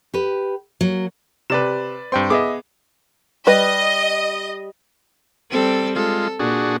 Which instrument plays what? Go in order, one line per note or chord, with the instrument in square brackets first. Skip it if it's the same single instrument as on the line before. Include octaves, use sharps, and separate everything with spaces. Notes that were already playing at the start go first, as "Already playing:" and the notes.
[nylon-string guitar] G4 B4
[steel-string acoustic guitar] F#3 [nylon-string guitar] A#3
[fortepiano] C3 G4 [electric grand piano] B4 D5 E7
[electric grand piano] G2 G5 C6 [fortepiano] C4
[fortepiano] B3 G#4 [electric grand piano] D#5 E5 D6
[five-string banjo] G3 B4 [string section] D#5
[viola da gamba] G3 C4 A4
[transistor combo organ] G#3 F4 [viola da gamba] A4
[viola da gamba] A#2 [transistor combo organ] D4 F#4 G#4